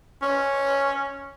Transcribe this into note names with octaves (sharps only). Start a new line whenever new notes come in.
C#4